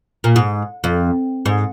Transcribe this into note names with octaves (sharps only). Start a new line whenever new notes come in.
A#2
G#2
F2
G#2